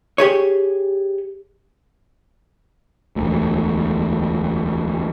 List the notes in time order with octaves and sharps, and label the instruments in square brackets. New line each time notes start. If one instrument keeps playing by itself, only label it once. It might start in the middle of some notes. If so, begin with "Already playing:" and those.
[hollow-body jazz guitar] G4 G#4 C#5
[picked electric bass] E1 D2